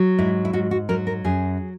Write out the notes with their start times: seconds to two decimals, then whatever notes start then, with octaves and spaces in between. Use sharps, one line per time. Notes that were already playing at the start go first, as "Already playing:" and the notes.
Already playing: F#3
0.18 G#2 E4
0.45 E4
0.53 G#2 F#4
0.71 F#4
0.89 F#3 A#4
1.07 A#4
1.24 F#2 G#4